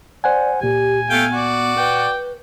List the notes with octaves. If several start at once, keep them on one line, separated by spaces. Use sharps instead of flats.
C5 D5 F#5 G#5
C#2 A#2 G4 G#5
A3 B3 F5 G5
F#4 D5
B4 G5